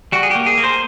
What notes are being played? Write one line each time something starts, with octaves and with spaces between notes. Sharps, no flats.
G3 F#4
G#4
G4
A#3
G#4
A#3
C5